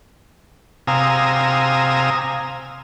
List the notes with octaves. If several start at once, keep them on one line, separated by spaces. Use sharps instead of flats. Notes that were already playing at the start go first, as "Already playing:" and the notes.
C3 F5 G#5 A#5 D#6 E6